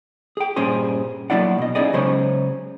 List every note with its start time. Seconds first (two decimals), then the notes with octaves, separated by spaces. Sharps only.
0.37 G#4 G5
0.56 G2 A#2 C#4 G#4 C5
1.30 F#3 A#3 D4 E4 D5 F#5
1.58 B2 D#5
1.75 C#4 D#4 E4 G#4 D5 D#5
1.93 C#3 F#3 G#3 C#4 C5 C#5